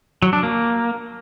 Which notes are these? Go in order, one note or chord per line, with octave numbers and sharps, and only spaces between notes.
F#3
D4
A#3